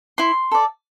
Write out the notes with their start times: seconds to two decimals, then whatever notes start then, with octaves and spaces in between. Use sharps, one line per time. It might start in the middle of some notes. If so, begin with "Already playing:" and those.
0.18 E4 C6
0.52 A4 D5